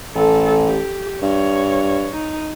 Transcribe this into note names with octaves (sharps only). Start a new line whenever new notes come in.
A1 A4
G4
G2 C#5
D#4